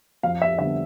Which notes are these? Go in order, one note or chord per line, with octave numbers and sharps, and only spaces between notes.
F2 F5
E5
D3 G3 B3 E5